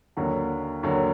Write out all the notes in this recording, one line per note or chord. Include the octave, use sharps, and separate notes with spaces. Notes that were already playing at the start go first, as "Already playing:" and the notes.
D#2 D3 F#3
D#2 D3 F#3